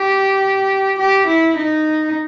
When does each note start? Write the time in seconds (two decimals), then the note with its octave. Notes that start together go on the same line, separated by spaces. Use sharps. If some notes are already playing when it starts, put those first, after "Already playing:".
Already playing: G4
0.99 G4
1.27 E4
1.57 D#4